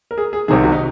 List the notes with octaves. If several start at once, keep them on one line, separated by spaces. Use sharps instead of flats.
A#4
G#4
G#4
C2 C3 D#3 G#4
F#4
D#4